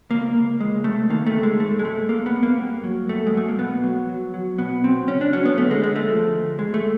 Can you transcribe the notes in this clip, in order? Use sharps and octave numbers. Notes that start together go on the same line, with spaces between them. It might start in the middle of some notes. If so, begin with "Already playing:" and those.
C#2 A#3
C#2
C#2 G#3
C3 A3
D#3 A#3
A3
C#2
G#3
G#2 A3
G#3
G#2 A3
G#2 A#3
B3
G#2
A#3
G2
F#3
G2 A3
G#3
F#3 A3
A#3
B2 B3
F#3
F#3
F#3
B2 B3
F#3 C4
C#2 C#4
D4
F#3 C#4
B3
D3 A3
G#3
D2 G#3
A3
F3
D2
G#2 G#3
A3